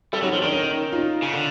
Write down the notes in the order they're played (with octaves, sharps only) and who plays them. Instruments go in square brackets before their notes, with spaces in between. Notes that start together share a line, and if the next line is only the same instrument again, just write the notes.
[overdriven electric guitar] G3 [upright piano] G4 A4
[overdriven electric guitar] F#3 [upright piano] C#4 D#4
[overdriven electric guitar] F3 [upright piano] C#4
[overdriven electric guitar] D#3 [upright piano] D4
[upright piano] C#4 D#4
D#4 F4
[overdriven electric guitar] C#3
D3